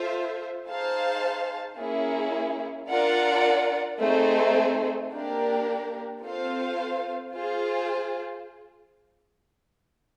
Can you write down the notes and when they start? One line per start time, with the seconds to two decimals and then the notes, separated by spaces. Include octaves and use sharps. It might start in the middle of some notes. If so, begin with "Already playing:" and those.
Already playing: F4 A4 C5 E5
0.67 D#4 G#4 C5 F5 A5
1.77 A#3 C#4 E4 G#4
2.89 D4 F4 A#4 D5 F#5
4.00 A3 C4 D#4 G#4 C5
5.11 A#3 D4 G4 A#4
6.22 C4 F4 A4 C5 F5
7.33 F4 G#4 C5